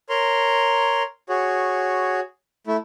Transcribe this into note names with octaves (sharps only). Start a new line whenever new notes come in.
A#4 C#5 A#5 C6
F#4 G#4 C#5
A3 E4